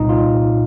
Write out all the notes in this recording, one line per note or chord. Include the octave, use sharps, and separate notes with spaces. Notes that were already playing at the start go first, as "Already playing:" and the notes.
Already playing: C2 A#2 D#4
F4